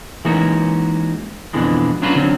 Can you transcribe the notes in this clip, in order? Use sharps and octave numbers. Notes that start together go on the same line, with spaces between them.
E3 G#3 A#3 C#4 D#4 F#4
F2 B2 D3 E3 G#3
F#3 C#4 D4 F4 F#4 B4
D3 F#3 C4 C#4